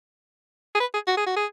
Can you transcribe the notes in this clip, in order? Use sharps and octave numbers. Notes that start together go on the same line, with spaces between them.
G#4
B4
G#4
F#4
G#4
F#4
G#4